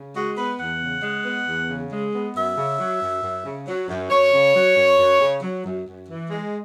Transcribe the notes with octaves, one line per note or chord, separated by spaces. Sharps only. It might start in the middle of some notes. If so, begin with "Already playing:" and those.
Already playing: C#3
G#3 F#4
B3 B4
E2 F#5
C#3
G#3
B3
E2
C#3
G#3
B3
F#2 E5
C#3
F#3
F#2
F#2
C#3
F#3
F#2
F#2 C#5
C#3
F#3
F#2
F#2
C#3
F#3
F#2
F#2
E3
G#3